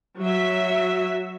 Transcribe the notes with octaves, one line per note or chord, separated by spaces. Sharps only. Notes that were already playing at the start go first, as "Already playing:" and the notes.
F#3 E5